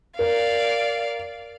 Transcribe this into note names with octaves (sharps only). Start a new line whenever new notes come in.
A#4 D5 F5